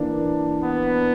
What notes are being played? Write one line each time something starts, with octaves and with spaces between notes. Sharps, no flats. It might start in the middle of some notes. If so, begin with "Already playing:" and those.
Already playing: E3 A#3 D4
B3